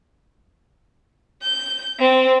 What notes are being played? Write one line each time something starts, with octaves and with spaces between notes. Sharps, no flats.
G6
C4